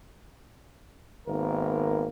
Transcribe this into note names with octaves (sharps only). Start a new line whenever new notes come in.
G#1 D#3 A#3 B3 A#4